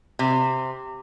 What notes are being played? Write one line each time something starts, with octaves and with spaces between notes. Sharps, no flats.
C3